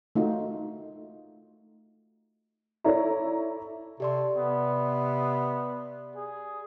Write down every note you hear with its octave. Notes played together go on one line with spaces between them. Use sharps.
A3 D#4 F4 F#4
E4 A4 C#5 D5 E5 A#5
C3 G4 A4 D5 C6
C3 B3
G#4